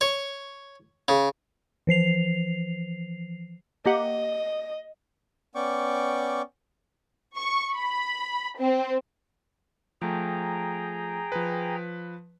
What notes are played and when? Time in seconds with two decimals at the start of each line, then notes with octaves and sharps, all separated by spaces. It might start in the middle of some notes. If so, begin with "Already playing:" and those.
0.01 C#5
1.08 C#3
1.87 E3 F3 C7 F7
3.86 A#3 G4 D#5 F#5
5.55 B3 C#4 D5 G5 C#6 D6
7.36 C#6
7.75 B5
8.58 C4
10.02 F3 A3 G#4 G5 A#5
11.32 F3 B4